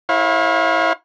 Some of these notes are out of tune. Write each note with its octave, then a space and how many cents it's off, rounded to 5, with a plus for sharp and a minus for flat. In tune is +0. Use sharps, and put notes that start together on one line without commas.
E4 -10 C#5 -35 F5 +30